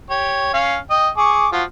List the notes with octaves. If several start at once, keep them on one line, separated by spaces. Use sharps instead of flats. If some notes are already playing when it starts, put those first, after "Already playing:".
G4 C#5
C#4 F5
D#5 G5
G#4 C#6 D6
F3 F4 F#4